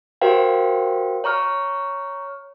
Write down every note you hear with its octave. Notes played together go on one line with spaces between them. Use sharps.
F#4 G4 A#4 C5 F5 G5
C#5 A#5 C#6 F6